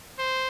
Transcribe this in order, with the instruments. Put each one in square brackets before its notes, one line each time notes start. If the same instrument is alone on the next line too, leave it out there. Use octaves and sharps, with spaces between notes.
[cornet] C5